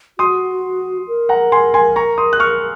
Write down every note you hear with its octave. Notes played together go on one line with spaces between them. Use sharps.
F#4 C6 D#6
A#4
F#5 A#5
G#5 C6
G#5 C6
A#5 C#6
C6 D#6
F#6
C#6 F6